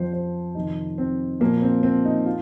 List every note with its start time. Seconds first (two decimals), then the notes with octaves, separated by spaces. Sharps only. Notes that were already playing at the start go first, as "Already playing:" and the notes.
Already playing: F2 F3 C5
0.13 C5
0.55 F2 C3 D#3 D#4
0.98 C4
1.40 A#2 F3 A#3
1.62 C4
1.83 C4
2.05 D#4
2.26 F4